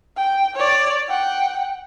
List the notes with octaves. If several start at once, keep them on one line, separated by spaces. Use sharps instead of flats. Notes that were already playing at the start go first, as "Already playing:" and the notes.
G5
C#5 D5
F#5 G5